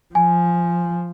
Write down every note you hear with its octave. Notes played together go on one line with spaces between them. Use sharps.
F3 G#5